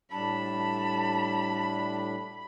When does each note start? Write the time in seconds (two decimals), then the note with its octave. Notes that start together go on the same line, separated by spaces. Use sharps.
0.11 A2 G3 D4 A5 B5